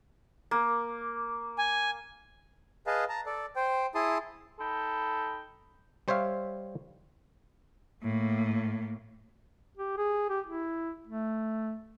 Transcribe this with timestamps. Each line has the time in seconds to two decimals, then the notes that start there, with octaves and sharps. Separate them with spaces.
0.51 A#3
1.58 G#5
2.87 G#4 B4 D#5 F5 A5
3.09 A5 A#5
3.26 A4 D5
3.56 C5 G5
3.95 E4 G#4 A5 C6 D#6
4.59 D#4 A4 G5 B5
6.08 G3 C5 C#5 E5 F5
8.03 A2 A#3
9.77 G4
9.97 G#4
10.29 G4
10.46 E4
11.07 A3